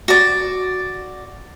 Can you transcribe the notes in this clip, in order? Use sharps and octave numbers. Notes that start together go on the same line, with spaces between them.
F#4 D5